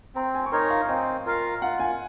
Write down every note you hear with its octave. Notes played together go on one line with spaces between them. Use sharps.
C4 A#5
G#5
C#6
D#4 A#4 C#5 C6
F5
C4 D#5
F4 A#4 F5
F4 F#5
G#5